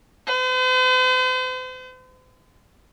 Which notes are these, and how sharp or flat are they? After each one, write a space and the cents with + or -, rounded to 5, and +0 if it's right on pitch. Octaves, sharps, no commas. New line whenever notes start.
C5 -45